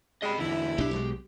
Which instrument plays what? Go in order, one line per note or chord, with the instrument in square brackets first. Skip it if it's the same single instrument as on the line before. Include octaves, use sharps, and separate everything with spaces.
[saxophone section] C#3 G3 G#3 [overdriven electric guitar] D#5 B5
[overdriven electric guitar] E2 D3 [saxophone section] E4
[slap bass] B1 D4 [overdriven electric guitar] G4
[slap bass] B1 B2 G#3